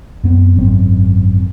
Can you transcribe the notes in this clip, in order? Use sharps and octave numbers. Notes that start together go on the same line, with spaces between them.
F#2 B3 C4
G#1 F#2 C4